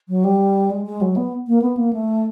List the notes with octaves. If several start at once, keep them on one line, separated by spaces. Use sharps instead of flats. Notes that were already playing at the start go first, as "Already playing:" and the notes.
F#3
G3
G#3
G#3
F#3
B3
A#3
B3
A#3
A3